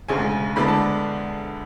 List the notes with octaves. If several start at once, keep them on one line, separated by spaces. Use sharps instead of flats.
E1 D2 C#3 G#3 G#5
D2 D3 G#3 B3 D4 B5
A5